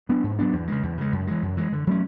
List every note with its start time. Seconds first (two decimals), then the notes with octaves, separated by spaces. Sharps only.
0.09 F#3 B3 D4
0.24 G#2
0.39 F#3 B3 D4
0.53 E2
0.68 C#3 G#3
0.83 E2
0.98 C#3 G#3
1.12 F#2
1.27 E3 G#3
1.43 F#2
1.57 E3 G#3
1.73 D3
1.87 F#3 A3 C#4